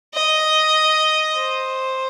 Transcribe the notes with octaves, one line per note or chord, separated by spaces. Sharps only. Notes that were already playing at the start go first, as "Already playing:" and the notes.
D#5
C5